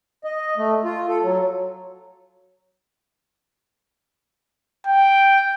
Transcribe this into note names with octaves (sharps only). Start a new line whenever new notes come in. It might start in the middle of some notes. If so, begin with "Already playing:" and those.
D#5
A3
F4
A4
F#3
G5